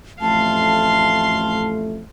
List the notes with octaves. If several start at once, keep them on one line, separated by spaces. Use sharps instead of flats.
A1 F2 A3 F5 A5 C6